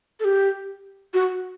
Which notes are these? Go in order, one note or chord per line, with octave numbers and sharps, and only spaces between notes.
A4
G4
F#4